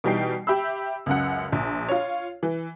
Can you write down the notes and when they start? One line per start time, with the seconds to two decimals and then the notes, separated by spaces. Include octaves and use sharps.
0.04 B2 E3 G3 D#4 G5 C7
0.47 G4 E5 B5 E6
1.06 C#2 F#2 F#5
1.52 A#1
1.89 F4 C#5
2.43 E3